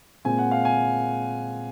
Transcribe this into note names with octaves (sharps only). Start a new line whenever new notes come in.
A#2 G#3 C4 G#5
F#5
F5
G#5